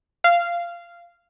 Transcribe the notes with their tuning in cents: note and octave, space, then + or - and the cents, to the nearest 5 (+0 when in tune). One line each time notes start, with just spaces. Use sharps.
F5 -15